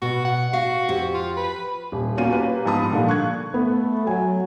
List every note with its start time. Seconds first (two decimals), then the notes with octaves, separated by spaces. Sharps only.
0.02 B2 F#4
0.25 F#5
0.53 F#4 F5
0.88 F2 G4
1.14 F4
1.37 B4
1.92 D#1
2.17 A#3 B3 C#4 F4 F#4 D#7
2.30 A#3 G4 B4
2.65 G#2 F3 B3 A5 B5 D#6
2.91 A#2 D3 F3 G3 A#3
3.08 C#6 F#6 G#6
3.54 A3 B3
4.07 F#3 G#5